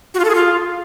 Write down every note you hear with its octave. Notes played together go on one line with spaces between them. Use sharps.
F#4
F4
A4
G#4
F4